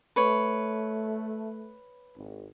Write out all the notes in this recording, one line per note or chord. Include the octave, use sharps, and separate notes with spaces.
A3 B4 C#5
G#1